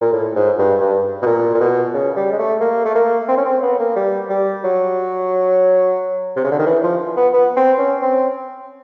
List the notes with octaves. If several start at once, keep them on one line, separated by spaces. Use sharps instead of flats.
A#2
A2
G#2
G2
G2
B2
A#2
A#2
B2
C#3
G3
G#3
A3
A#3
A3
A#3
C4
C#4
C4
B3
A#3
G3
G3
F#3
C3
C#3
D3
D#3
E3
F3
B3
B3
C4
C#4
C4